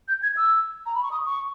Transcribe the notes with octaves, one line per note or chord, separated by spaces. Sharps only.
G6
G#6
E6
A#5
B5
C#6
D#6
C#6